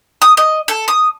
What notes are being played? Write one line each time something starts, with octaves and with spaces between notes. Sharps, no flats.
D#6
D#5
A4
D#6